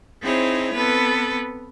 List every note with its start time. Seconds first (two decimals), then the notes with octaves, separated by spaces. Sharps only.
0.22 C4 D#4 E4 G#4 C5 C#5
0.74 B3 C4 A4 B4